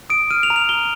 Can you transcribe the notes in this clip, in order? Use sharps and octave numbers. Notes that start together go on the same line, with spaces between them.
D#6 D7
F6 D#7
F7
A#5
F7
A#5 G7